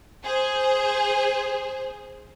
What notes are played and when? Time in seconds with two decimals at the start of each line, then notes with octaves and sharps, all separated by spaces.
0.24 G#4 C5